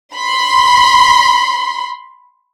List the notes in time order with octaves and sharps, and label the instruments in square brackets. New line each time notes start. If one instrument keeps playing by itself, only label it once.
[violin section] B5 C6